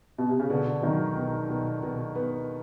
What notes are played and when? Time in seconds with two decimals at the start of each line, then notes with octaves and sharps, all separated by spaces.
0.18 B2
0.29 C3
0.40 C#3
0.50 B2 D3
0.66 D3
0.82 D#3 F#3
1.16 B2
1.49 B2
1.82 B2
2.15 B3